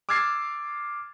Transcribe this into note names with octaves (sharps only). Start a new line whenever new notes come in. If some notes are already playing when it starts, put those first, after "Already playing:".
D6 E6 F6 G#6 A6 C7